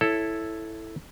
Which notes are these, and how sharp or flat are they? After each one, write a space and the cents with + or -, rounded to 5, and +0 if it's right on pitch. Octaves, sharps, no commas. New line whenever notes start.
E4 +0 A4 +0 C#5 -5